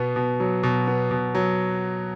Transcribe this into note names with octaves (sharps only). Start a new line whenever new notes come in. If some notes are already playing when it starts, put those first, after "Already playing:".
Already playing: B2 B3
B2
F#3
B2
B3
B2
F#3